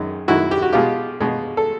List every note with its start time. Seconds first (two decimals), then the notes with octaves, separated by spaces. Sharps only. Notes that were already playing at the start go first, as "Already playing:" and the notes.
Already playing: F#2 D#3 G#3
0.28 F#2 D#3 G#3 E4 F#4
0.51 G4
0.62 F#4
0.72 B2 G#3 F4 G4
1.20 B2 G#3
1.57 A4